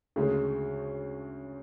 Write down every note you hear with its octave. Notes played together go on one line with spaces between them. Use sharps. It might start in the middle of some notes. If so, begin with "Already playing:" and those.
D2 C#3 G#3